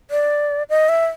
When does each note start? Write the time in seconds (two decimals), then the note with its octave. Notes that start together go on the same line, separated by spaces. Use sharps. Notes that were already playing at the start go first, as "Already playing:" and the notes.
0.11 D5
0.70 D#5
0.89 E5